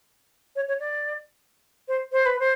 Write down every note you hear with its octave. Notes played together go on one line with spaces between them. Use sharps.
C#5
C#5
D5
C5
C5
B4
C5